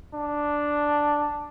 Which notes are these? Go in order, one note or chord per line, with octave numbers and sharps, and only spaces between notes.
D4